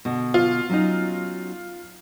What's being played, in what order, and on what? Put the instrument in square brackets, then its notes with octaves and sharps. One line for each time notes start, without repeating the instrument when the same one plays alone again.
[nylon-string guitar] B2 D3
[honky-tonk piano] F4
[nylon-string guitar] F#3 C#4 D#4